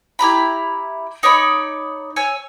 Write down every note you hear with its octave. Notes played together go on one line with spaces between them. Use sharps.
E4 G4 A#5 B5
D#4 C#5 D5 B5
C#5 G#5 E6